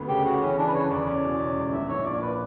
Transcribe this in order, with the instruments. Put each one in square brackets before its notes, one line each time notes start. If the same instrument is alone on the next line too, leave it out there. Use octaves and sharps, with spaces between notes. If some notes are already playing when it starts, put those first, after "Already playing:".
Already playing: [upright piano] D2 B3
[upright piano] C#3 [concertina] G4
[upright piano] C#3 [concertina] F#4
[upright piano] E3 [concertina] C#4
[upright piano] E3 [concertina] D4
[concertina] B4
[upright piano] C#3 [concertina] C#5
[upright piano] E2 [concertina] D5
[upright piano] C#4
B2
C#4
C#2
[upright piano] A#1 [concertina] E5
[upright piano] A#1 [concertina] C#5
[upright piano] A#2 [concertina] D5
[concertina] B4